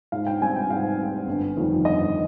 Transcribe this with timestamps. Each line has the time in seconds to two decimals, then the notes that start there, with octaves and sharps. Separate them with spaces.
0.12 G#2 F5
0.27 G5
0.41 G3 C4 G#5
0.56 G5
0.69 G#2 F5
0.98 G3 C4
1.27 G1
1.56 F2 D#3 G3
1.85 G1 D#5